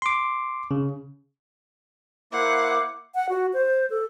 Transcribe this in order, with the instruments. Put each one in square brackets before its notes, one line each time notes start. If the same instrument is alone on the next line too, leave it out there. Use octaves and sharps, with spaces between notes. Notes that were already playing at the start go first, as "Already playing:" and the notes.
[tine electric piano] C6 D6
C#3
[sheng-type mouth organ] A#3 E4 C5 [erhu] F#5 [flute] D6
[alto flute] F#5
F#4
C5
A4